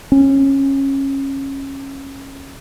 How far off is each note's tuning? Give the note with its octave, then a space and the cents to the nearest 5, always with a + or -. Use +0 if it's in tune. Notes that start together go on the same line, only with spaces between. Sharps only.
C#4 -20